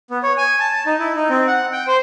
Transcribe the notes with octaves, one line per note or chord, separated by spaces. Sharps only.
B3
C#5
G#5
A5
A5
D#4
E4
D#4
C4
F#5
G5
C5